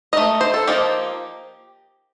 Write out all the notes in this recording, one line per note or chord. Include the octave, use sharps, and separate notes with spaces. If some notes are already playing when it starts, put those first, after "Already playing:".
A3 D#4 D#5
C5
A4
F3 A#3 D#4 G4